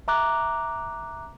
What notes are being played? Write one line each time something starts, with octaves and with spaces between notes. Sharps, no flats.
E5 A#5 D6 F#6